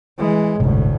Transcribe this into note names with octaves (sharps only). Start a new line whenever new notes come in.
E3 G#3
G1 D2 A2 C3 G#3